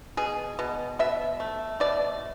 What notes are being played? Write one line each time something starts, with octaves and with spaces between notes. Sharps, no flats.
B2 G#4
B2
B2 E5
A3
B2 D5